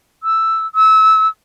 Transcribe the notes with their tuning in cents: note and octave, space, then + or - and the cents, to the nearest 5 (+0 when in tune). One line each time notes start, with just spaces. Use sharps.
E6 +0
E6 -25